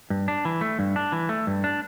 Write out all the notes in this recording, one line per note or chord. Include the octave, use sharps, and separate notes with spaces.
G2
D4
E3
A3
G2
D4
E3
A3
G2
D4